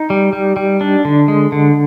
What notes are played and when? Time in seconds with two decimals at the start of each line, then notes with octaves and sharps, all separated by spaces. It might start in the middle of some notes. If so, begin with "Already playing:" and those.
Already playing: D#4
0.10 G3
0.33 G3
0.56 G3
0.81 D4
1.05 D3
1.28 G#3
1.52 D3